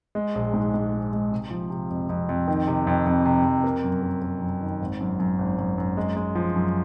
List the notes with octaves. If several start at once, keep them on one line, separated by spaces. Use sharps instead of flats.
G#3
A#1
G#2
G#2
G#3
G#3
C3
F3
C3
F2
F2
F2
D#3
C3
F2
F2
C3
F2
A#3
F#2
A#3
A#3
F#2
D#3
G#1
F#2
F#2
G#1
F#2
F#2
G#3
G#3
F3
F#2